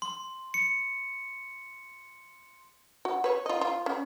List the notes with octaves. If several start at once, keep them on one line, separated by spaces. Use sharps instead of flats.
C6
C#7
F#4
B4 C#5
F4 D#5
F4
C#4